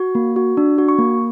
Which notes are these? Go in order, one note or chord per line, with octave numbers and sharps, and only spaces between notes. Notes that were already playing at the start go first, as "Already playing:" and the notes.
Already playing: F#4
A#3
F#4
D4
F#4
C#6
A#3